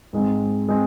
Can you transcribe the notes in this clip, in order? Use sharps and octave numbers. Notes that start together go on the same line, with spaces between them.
G#2 G#3 C4
G#3 C4